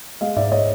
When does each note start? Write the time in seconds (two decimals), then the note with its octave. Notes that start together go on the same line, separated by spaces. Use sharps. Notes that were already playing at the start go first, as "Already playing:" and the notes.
0.21 G#3 D#5 F5
0.36 G#2 D5 E5
0.52 C#5 D#5